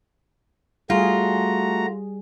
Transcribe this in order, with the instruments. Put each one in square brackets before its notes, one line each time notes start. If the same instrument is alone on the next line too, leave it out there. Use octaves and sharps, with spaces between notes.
[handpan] G3 G#4 [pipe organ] A3 F#4 A#5 [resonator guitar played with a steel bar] F4